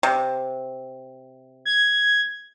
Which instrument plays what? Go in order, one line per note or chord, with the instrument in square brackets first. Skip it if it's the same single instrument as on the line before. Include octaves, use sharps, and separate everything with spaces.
[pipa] C3
[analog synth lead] G#6